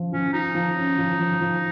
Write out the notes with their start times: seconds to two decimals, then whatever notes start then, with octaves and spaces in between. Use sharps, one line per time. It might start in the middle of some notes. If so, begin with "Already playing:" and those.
Already playing: F3 F4
0.12 F3 C#4
0.33 D#4 F4
0.55 F3
0.77 C#4
0.98 F3
1.19 F3
1.41 F3